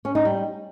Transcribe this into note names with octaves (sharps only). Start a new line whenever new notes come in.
C#4
D#4
G3